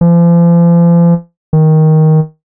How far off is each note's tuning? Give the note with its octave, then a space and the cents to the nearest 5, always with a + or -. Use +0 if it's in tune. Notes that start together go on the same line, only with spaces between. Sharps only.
F3 -40
D#3 +10